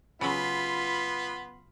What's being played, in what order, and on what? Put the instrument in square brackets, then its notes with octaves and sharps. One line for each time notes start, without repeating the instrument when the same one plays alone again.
[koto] C#3 F#3 [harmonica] B3 [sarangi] F4 [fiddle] B5 C6